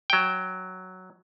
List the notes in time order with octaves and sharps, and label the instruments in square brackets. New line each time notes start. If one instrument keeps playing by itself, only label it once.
[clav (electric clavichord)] F#3 G5